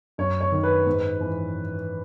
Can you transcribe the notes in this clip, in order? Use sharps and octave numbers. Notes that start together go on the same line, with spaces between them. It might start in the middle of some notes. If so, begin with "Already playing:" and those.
F#2 C#5
C#5
D#3
B4
G#2
E3